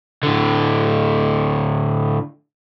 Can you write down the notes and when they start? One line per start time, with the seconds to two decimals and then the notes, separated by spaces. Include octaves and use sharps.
0.23 A2 D3